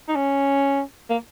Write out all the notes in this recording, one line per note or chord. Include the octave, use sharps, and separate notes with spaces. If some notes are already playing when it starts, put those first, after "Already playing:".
D#4
C#4
A#3